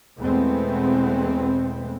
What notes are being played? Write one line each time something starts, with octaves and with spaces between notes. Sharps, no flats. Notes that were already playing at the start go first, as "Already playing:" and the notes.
E2 B2 G#3 A3 B3 C4